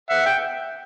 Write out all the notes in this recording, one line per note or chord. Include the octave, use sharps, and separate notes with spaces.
E5 F#5
G5